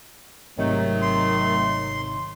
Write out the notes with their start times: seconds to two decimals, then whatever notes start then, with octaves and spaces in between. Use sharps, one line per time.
0.58 G#1 C3 D#3 F#3 A3 D#4
1.02 C6